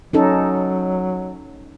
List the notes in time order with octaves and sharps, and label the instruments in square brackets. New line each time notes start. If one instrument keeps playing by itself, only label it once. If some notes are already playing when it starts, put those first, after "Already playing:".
[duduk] F#3 [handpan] C#4 D#4 A4